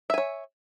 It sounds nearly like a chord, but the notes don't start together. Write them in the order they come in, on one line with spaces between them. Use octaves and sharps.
E5 G#5 C#5